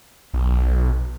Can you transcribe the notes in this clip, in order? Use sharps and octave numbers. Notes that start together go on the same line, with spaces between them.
B1